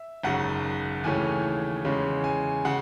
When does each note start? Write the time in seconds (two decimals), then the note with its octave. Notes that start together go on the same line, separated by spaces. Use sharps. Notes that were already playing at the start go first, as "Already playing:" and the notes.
Already playing: E5
0.24 G#1 F#2 C#3 F#5
1.04 D#2 C#3 E3 A3 C#4 G#5
1.85 E2 C#3 G#3 C#4
2.24 G#5
2.65 C#3 F#5